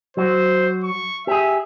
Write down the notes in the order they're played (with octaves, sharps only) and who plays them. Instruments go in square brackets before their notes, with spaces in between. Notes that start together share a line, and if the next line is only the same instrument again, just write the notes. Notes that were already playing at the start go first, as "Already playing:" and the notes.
[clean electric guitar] F#3 F#4 [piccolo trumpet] C5
[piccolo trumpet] C#6
[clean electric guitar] G4 G#4 [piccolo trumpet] E5